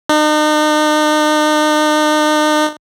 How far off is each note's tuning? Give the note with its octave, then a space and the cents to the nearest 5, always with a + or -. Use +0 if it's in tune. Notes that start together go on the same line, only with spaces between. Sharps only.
D#4 -40